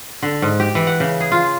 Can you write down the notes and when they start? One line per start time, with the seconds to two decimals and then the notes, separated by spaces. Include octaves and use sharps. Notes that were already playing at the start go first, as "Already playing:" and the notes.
0.23 D3
0.42 G#2
0.60 G4
0.75 E3
0.87 F#5
1.00 C#3
1.20 G#4
1.32 F4